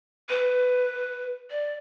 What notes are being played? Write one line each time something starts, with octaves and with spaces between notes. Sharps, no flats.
B4
D5